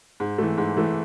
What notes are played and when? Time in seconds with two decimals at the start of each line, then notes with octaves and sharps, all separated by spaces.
0.20 G#2
0.38 E3 A3
0.58 G#2
0.77 E3 A3